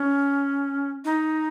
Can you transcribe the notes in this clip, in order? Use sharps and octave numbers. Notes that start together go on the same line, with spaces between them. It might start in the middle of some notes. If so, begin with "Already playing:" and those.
Already playing: C#4
D#4